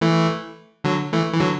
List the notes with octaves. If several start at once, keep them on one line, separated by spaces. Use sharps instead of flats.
E3 A3
D3 F#3
E3 A3
E3
D3 F#3